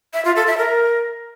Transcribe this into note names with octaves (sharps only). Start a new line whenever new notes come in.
E5
F4
A4
E5
A#4